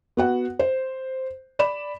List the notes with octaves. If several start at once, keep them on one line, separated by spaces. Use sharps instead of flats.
B3 F#4 F#5
C5
D5 B5 E7